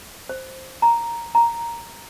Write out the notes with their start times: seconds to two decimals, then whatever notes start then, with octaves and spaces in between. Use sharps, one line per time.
0.29 C5
0.82 A#5
1.35 A#5